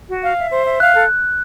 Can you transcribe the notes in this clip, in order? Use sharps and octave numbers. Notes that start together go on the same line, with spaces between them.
F#4
F5
E5
C5
E5
F5 F#6
A4